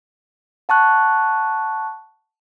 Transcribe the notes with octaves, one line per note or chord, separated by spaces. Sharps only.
F#5 A5 C#6 F#6